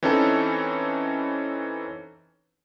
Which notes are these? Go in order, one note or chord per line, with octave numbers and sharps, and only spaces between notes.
E3 C4 C#4 D#4 E4 A4